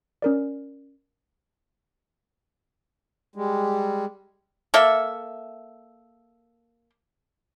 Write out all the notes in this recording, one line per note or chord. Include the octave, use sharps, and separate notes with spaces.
C#4 A#4 D5
G3 G#3
A#3 A4 E5